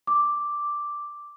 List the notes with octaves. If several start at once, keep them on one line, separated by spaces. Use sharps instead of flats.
D6